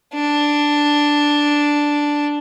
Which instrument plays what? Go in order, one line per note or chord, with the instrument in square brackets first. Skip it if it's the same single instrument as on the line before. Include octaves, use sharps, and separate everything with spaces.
[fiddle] D4